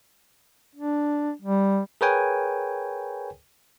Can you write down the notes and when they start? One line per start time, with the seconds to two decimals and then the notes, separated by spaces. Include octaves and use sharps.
0.75 D4
1.42 G3
2.01 G#4 A#4 B4 C#5 G5 G#5